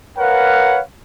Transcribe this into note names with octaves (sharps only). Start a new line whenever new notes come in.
A#4 B4 C#5 F5 F#5